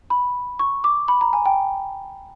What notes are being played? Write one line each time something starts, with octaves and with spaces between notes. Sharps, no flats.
B5
C#6
D6
B5
A#5
G#5
G5